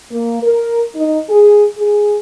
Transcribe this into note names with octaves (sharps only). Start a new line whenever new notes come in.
A#3
A#4
D#4
G#4
G#4